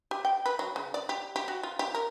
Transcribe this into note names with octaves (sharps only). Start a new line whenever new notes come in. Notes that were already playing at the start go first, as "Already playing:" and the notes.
G4
G5
B4
F#3
C#3
D5
G4
G4
F#4
F4
G4
A#4